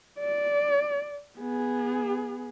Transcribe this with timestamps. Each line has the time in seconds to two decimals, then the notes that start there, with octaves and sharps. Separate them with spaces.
0.19 D5
1.38 B3 G#4